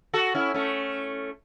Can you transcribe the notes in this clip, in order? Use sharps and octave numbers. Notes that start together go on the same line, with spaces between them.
F#4 A4
C#4 E4
A3 C#4